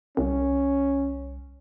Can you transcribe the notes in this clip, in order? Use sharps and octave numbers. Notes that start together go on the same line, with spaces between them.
C2 C#4